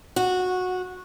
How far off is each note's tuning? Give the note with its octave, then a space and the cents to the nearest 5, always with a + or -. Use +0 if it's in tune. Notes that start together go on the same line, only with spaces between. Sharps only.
F#4 -15